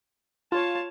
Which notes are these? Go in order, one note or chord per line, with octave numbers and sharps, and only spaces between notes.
F4 C#5 A5